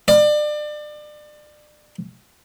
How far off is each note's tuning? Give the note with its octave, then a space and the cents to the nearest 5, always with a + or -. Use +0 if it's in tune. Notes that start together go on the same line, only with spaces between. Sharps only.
D5 +30